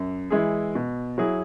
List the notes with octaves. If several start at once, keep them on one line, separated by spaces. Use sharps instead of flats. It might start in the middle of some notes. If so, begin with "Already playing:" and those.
Already playing: F#2
E3 G#3 E4 G#4
B2
F#3 E4 G#4